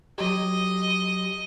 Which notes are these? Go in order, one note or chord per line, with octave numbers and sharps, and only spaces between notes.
F#3 G4 D#5